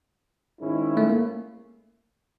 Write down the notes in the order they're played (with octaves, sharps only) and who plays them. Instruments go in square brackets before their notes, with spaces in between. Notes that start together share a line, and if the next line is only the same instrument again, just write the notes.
[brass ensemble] G#2 D#3 G#3 C#4 E4
[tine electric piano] A3
A#3